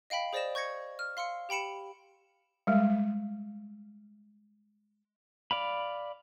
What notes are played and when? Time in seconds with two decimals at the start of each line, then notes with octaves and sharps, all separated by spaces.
0.10 D#5 F5 G5 B5 B6
0.33 G#4 C5 D5 D#5 A#6 E7
0.55 C#6 G6 G#6 A#6 C#7
0.99 F6
1.17 F5 C6 E6 C#7
1.49 G4 G5 B5 C#7 E7
2.67 G3 G#3
5.51 D5 F5 B5